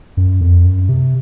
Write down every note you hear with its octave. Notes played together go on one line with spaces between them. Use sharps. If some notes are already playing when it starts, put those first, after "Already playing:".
F#2
F2
F#2
C3